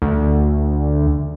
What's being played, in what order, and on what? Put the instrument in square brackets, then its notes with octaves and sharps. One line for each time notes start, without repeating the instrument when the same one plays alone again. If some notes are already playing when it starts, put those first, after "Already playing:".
[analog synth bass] D2